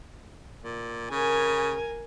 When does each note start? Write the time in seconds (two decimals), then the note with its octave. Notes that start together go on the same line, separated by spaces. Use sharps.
0.62 A#2
1.11 C#3 A#4 G#5